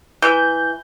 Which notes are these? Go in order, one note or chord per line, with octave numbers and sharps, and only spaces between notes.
E3 G6